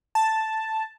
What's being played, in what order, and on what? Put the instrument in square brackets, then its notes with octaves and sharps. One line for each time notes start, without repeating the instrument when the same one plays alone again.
[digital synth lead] A5